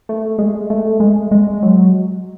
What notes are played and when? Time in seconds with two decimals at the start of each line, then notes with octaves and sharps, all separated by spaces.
0.09 A3
0.39 G#3
0.70 A3
1.00 G#3
1.31 G#3
1.63 F#3